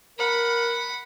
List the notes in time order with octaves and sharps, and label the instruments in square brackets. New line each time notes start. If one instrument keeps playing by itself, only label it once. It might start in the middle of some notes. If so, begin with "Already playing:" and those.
[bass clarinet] A#4 [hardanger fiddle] F#5 B5